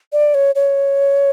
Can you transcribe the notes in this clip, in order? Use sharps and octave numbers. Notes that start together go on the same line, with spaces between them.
D5
C#5
C#5